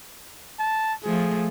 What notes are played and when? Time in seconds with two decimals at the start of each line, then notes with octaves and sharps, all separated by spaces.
0.59 A5
1.04 F3 A3 G#4